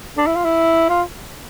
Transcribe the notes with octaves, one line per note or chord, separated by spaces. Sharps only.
D4
E4
F4
E4
F4